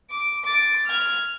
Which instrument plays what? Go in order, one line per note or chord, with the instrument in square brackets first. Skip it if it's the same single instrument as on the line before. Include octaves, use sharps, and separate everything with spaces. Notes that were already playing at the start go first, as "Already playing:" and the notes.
[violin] D6
D6 A6
F6 G#6